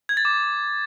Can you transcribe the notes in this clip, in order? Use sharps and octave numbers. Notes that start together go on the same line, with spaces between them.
G#6
A6
D6